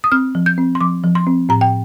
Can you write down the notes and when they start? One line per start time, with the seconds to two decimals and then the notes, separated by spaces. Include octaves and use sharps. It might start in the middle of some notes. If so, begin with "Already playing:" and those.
0.04 D#6
0.12 C4 F6
0.35 F3
0.46 G6
0.58 C4
0.75 C6
0.81 F3 D6
1.03 F3
1.15 C6
1.27 C4
1.49 A2 A#5
1.61 G5